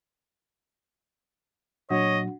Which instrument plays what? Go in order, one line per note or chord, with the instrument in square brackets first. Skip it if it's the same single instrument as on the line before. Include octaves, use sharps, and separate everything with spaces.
[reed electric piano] A#2 F#3 [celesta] D4 F#4 F#5 [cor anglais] C#5 [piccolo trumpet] D#5